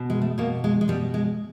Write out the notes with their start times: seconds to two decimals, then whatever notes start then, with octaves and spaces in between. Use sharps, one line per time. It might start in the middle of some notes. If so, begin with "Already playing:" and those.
Already playing: B2
0.10 G#3
0.22 A3
0.38 B2 A#3
0.64 G#3
0.81 G#3
0.88 B2 G3
1.14 G#3